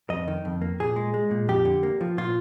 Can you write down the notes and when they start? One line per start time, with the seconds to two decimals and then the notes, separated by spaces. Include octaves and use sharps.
0.10 F2 D#5
0.28 D#3
0.45 F2
0.62 A#3
0.80 A#2 G#4
0.96 G#3
1.14 G#3
1.31 A#2
1.48 F2 G4
1.65 D3
1.83 A#3
2.01 F3
2.17 A#2 F4